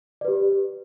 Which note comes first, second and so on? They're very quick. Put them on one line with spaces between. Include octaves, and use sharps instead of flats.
D5 B4 G4